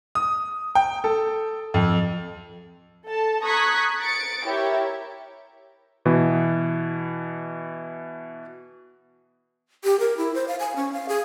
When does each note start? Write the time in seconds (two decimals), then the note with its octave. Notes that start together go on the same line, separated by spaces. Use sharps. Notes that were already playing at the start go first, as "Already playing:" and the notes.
0.15 D#6
0.75 G5
1.04 A4
1.74 F2
3.07 A4 A5
3.43 A#5 C#6 D#6 F#6 G#6 B6
4.00 A6 C#7 D7
4.45 E4 G4 A#4 C#5 E5
6.05 B2 E3
9.84 G4
10.00 A#4
10.17 E4
10.35 C5
10.48 F5
10.60 G#5
10.76 C#4
10.93 F5
11.09 G#4